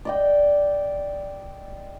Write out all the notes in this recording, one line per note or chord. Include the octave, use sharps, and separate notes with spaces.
D5 D#5 G5